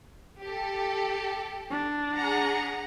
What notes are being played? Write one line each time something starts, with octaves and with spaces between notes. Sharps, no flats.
G4 A4
D4
G#4 F#5 A#5